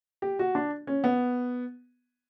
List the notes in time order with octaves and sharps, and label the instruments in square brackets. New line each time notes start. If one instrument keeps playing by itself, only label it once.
[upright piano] G4
F#4
D4
C#4
B3